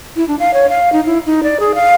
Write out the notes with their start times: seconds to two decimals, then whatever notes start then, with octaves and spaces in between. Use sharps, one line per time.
0.16 E4
0.28 D4
0.40 F5
0.54 C#5
0.70 F5
0.93 D#4
1.06 E4
1.26 D#4
1.43 D5
1.60 G#4
1.75 F5